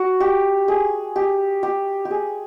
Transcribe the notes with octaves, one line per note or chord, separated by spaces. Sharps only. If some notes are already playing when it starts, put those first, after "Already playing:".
Already playing: F#4
G4
G#4
G4
G4
G4
G#4